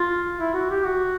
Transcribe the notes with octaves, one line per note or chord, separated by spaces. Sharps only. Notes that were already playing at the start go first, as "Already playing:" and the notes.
Already playing: F4
E4
F#4
G4
F#4